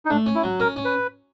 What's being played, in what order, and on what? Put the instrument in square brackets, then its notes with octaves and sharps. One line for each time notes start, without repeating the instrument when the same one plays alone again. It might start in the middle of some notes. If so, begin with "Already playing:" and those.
[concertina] D#4
[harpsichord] A3 [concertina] D4
[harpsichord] C#4
[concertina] E4
[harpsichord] F#3
[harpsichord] C#4 [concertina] A#4
[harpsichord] C#4
[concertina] B4